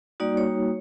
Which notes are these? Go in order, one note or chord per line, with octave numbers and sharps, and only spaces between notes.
G3 A#3 D#4 F#4 D5
C#5